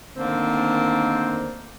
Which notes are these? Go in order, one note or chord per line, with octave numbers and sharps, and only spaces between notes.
D3 D#3 A3 A#3 C4